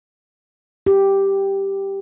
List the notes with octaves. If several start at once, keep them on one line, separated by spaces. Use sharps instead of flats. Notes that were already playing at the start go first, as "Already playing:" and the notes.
G4